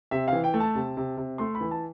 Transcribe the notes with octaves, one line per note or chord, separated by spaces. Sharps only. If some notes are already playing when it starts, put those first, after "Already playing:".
C3 E5
E3 F5
G5
A3
A5
C3
C3
C3
A3 C6
B5
E3
A5